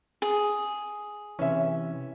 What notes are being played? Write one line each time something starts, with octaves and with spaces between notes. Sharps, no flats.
G#4
C3 E3 C#4 E5